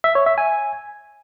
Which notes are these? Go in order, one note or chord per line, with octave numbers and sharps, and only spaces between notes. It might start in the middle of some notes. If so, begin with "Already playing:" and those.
E5
C#5
E5
G#5